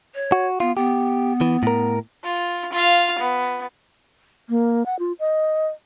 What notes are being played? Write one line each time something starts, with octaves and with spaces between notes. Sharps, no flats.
C#5
F#4
B3 F4
B3 G4
E3
A2 A#4
F4
F4 F5
B3
A#3
F#5
F4
D#5